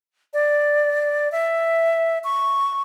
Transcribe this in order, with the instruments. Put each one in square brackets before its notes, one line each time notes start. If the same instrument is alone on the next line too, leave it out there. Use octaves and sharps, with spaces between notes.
[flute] D5
E5
C#6